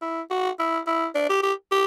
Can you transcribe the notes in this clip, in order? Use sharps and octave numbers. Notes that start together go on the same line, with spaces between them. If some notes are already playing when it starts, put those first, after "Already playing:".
E4
F#4
E4
E4
D4
G4
G4
G4